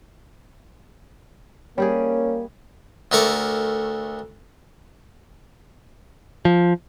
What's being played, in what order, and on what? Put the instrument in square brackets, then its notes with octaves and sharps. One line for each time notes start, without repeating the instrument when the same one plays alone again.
[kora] G3 G4 G#4 [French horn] A#3 [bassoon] C#4
[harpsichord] D2 A3 A#4 C#6 D6
[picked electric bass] F3